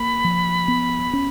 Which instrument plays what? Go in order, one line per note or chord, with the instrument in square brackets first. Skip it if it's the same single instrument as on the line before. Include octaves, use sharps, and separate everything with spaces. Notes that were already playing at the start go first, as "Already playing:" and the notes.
Already playing: [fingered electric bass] A#3 [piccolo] B5
[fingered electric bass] F3
B3
C#4